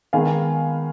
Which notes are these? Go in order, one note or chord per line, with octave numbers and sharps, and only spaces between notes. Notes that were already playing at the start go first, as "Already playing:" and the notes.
D#3 G#3 B3 F5 G#5